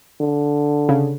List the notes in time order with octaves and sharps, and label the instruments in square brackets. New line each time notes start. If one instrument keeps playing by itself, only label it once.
[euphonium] D3
[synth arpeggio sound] C#3